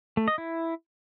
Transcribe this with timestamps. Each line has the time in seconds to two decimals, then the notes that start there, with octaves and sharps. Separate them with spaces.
0.17 A3
0.28 D#5
0.38 E4